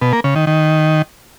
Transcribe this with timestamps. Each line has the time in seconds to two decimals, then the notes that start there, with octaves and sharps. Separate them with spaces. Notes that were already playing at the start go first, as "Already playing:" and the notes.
0.01 B2
0.13 A#3
0.24 C#3
0.36 D#3
0.47 D#3